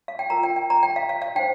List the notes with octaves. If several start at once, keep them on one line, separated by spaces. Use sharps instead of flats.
F5
G5
F4 A#4 A#5
G5
G5
A#5
G5
F5
F5
F5
D#4 C5 G5